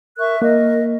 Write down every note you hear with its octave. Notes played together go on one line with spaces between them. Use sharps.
A#4 E5 C#6 F#6
A#3 A#4 D#5